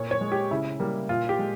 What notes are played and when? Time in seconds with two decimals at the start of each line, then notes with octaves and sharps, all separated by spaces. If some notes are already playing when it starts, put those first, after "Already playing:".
Already playing: A#2 C#5
0.11 C#5
0.21 G#3
0.32 G4
0.51 C#3 E4
0.80 G3 A#3
1.09 A#2 F4
1.29 G4
1.39 G#3